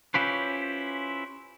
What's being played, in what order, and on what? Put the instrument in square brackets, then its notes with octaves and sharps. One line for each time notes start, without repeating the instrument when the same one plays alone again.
[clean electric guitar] C#4 E4 F4 G4 B4 C5